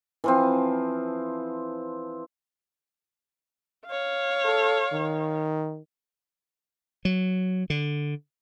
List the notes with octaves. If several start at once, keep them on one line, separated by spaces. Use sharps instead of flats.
E3 F3 C4
C#5 F5
A4
D#3
F#3
D3